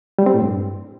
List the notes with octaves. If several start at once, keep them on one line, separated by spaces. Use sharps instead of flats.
G3
C4
A2
G2